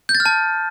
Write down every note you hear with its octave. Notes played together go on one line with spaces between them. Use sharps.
G6
A6
F6
A5